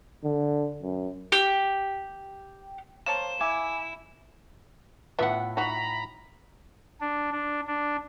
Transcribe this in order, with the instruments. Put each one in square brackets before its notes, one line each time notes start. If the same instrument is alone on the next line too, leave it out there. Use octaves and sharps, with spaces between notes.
[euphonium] D3
F#2
[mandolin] G4
[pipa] A#3 C#5 A5 [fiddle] C5 [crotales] E7
[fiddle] E4 [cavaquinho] E5 G#5 D6
[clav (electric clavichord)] A2 F4 [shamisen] B3 [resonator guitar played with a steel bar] E5 F#5
[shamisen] D#4 F#4 [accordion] A#5 B5
[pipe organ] D4
D4
D4